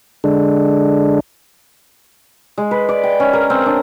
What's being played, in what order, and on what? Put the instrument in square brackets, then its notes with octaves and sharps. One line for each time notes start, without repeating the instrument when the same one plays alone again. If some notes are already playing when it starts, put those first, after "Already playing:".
[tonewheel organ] D3 G#3 D4
[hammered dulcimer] G#3
B4
D5
G5
C#4
A#4
C4
D4